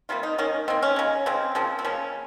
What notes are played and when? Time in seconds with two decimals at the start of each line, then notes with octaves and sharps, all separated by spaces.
0.09 C3 G3 A#3 F4
0.23 D#4
0.38 D#3 A#3 C#4
0.68 D#3 A#3 C4
0.82 C#4
0.96 C#3 G#3
1.26 C#3 G#3 C4
1.55 C#3 F3 A#3
1.79 C4
1.85 C#3 F3 A#3 C#4